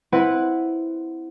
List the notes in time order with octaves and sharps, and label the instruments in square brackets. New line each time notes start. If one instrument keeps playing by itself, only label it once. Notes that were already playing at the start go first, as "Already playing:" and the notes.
[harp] C4 E4 B4 F#5